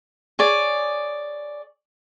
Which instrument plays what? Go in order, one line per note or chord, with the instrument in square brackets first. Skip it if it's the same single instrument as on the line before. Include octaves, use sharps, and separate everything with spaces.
[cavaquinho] G#4 C#5 D5